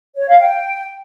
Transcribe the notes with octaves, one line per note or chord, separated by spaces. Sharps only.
C#5
F5
G5